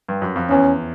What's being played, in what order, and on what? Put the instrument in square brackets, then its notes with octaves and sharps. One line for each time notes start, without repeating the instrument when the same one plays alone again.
[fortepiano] G2
F#2
F2
[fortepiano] E2 [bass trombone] C#4